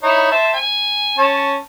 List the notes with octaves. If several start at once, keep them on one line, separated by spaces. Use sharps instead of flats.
D#4 E4 C#5
C5 E5 A5
G#5
C#4 C#5 A5